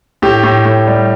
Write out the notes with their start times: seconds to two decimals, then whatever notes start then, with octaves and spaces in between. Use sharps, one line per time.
0.22 A2 G4
0.43 A2
0.65 A2
0.87 G3